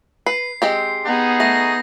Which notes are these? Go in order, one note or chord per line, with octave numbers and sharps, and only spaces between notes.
B4 C7
G#3 C4 G4
B3 D#4 G#4
A3 A#6